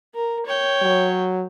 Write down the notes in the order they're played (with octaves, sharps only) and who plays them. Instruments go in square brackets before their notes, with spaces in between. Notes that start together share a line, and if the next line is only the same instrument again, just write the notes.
[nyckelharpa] A#4
C#5 G5
[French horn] F#3